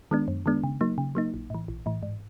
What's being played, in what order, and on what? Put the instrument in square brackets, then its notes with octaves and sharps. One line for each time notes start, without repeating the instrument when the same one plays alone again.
[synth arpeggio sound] D#3 G#3 B3 D4
F#2
D#3 G#3 B3 D4
C#3
F#3 A#3 D#4
C#3
F#3 A#3 D#4
A#1
A2 E3
A#1
A2 E3
G#2